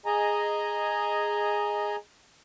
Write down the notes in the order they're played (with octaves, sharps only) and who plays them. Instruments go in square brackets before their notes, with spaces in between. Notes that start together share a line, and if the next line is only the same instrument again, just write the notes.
[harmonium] G#4 D#5 G#5 A#5